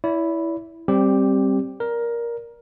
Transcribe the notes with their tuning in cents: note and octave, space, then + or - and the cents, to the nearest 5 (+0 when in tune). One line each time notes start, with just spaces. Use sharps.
E4 +0 D5 -45
G3 +0 C4 +15 G4 +0
A#4 +10 D5 +0